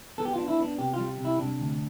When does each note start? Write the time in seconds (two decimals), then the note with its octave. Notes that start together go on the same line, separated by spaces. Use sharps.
0.18 B3 A4
0.25 G4
0.33 F4
0.38 D4
0.48 E4
0.58 B3 D4
0.78 C3 G4
0.94 G3 F4
1.19 C3
1.25 E4
1.39 C3 D4
1.60 D2